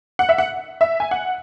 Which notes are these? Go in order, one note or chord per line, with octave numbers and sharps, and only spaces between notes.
F#5
E5
F#5
E5
G#5
F#5